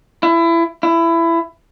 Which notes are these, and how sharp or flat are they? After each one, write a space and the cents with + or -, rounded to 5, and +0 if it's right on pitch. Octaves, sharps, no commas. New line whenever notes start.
E4 +25
E4 +20